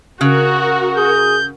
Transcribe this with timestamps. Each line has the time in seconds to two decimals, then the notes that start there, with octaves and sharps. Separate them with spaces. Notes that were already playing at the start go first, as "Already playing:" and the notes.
0.21 C#3 F#4 A#4 F#6
0.97 G#4 G6